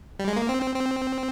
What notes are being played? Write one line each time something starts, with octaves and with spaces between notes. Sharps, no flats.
G3
G#3
A#3
C4
C4
C4